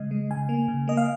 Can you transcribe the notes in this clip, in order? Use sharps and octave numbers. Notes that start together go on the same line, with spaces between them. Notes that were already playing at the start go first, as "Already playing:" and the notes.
Already playing: C#3 G#3 D#5
G#3
C#3 G#5
A#3
C#3
A#3 D#5
F5